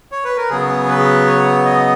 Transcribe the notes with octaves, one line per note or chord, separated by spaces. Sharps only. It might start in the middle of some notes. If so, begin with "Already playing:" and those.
C#5
B4
A#4
C#3 F#3 B3 G#4
B4
C#5
D#5